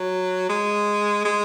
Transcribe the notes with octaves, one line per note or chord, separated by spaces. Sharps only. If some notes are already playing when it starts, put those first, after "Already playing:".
Already playing: F#3
G#3
G#3